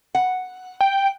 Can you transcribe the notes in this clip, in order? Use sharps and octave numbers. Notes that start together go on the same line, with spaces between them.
F#5
G5